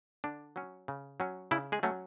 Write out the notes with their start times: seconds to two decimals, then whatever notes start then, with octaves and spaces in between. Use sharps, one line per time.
0.24 D3 D4
0.56 F#3 C#4
0.88 C#3
1.20 F#3 C#4
1.51 C#3 E4
1.72 G#3 G#4
1.83 F#3 A3 C#4